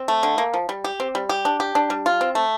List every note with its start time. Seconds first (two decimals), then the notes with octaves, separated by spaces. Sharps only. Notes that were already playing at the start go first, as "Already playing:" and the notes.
Already playing: C4
0.08 A3
0.23 D3
0.38 A#3
0.54 F3
0.69 G3
0.84 G4
1.00 C4
1.15 G3
1.29 G4
1.45 D4
1.60 G4
1.75 D4
1.90 G3
2.06 F4
2.21 C4
2.35 A3